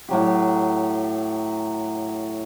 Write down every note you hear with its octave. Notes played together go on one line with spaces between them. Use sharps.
A2 F#3 G4